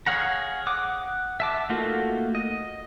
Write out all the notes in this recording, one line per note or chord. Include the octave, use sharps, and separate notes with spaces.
G#4 C#5 F5 F#5 A#5
F#5 D6 D#6
E5 A5 D6
A3 A#3 D#4 F4 F#4
D#5